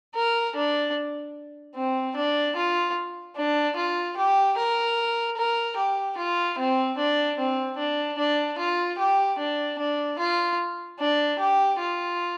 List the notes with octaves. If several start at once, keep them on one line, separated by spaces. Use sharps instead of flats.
A#4
D4
C4
D4
F4
D4
F4
G4
A#4
A#4
G4
F4
C4
D4
C4
D4
D4
F4
G4
D4
D4
F4
D4
G4
F4